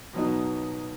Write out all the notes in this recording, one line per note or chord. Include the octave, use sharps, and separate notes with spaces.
B2 F#3 B3 D#4